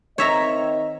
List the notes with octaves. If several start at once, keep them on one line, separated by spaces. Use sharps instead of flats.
D#3 C4 C#5 D#5 E5 A#5